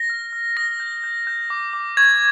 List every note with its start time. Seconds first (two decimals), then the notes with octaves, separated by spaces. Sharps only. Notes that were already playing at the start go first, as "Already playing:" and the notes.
Already playing: A#6
0.10 F6
0.33 F6
0.57 D#6 A#6
0.80 G6
1.04 G6
1.27 G6
1.50 D6
1.73 D6
1.97 C#6 G#6